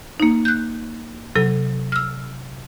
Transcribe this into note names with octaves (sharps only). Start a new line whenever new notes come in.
A#3 D#4
F#6 G6
C3 F#3 A4
E6 F6